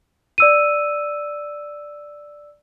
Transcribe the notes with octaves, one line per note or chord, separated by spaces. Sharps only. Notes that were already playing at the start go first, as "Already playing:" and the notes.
D5 E6 D#7